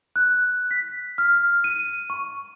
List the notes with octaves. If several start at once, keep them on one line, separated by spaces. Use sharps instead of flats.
F#6
B6
F6
D#7
C#6